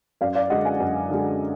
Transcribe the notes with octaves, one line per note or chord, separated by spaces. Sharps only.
F#2 D5 F5
D5 F5
D3 G#3 D#5 F#5
F5 G#5
F#2
D3 G#3